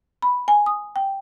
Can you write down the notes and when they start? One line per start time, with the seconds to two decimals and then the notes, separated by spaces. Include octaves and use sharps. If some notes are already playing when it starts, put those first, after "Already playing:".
0.22 B5
0.48 G#5
0.66 D#6
0.96 G5